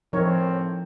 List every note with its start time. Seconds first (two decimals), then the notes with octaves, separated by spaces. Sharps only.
0.13 A2 F3 C4 D#4 A#4 C#5